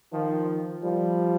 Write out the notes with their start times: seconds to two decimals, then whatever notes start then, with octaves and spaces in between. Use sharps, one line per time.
0.12 D#3 F3
0.83 F3 G3